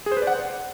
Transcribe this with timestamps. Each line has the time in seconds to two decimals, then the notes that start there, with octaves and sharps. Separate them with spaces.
0.06 G#4
0.12 C5
0.17 B4
0.22 D5
0.27 F#5